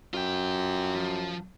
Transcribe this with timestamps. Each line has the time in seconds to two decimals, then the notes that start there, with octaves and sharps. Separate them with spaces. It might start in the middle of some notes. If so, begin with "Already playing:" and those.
0.14 F#2 F4 G5
0.96 F3